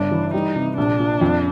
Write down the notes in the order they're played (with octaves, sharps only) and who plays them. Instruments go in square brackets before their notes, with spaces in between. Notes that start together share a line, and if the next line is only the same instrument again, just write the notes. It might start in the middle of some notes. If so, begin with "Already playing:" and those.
Already playing: [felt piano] G1 C#3 [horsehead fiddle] D4
[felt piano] E3
[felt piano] G3 [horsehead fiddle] D#4
[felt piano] C3
[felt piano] A#1 [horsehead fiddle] D4
[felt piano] A#2
F2